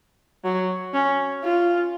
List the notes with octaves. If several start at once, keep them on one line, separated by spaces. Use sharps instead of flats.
F#3
C#4
F4